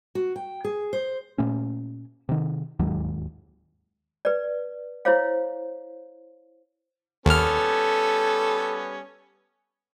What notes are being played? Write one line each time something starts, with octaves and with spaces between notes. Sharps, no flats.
F#4
G5
G#4
C5
A#2 A3 C#4
C3 D#3
D1 D#2 G#2 F#3
B4 D5
E4 C5 C#5 F5
D#2 G3 B3 C#4 A4 F6